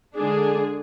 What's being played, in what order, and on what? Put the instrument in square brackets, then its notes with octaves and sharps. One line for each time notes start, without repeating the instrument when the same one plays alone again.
[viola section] D3 G#3 D4 G#4